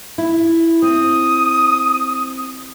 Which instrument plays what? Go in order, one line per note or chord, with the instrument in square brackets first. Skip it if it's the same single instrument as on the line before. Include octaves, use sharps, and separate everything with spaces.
[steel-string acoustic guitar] E4
[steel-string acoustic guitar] C4 [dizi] D#6